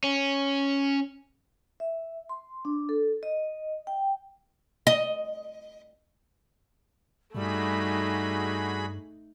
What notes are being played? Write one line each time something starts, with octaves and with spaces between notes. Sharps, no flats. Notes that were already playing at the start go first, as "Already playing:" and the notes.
C#4
E5
C6
D4
A4
D#5
G5
D#5
G2 G3 A3 D#4 F#4 G#4 B5